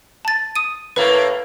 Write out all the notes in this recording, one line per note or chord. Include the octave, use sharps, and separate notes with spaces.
A5 A6
D#6 D#7
A2 A#3 B4